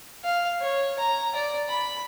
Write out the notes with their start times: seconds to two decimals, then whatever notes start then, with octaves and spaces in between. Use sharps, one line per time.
0.24 F5
0.61 C#5
0.99 A#5
1.35 D5
1.69 B5